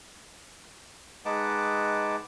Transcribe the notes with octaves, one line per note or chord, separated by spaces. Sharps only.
G#3 D#4 B4 F#5 A5 D6